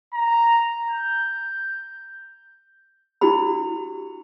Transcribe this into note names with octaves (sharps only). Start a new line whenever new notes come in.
A#5
G6
D4 E4 F#4 G4 B5